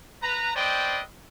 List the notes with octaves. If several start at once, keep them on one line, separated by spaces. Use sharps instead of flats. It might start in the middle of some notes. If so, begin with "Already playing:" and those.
B4 A#5
C4 B4 C5 D5 D#5 G5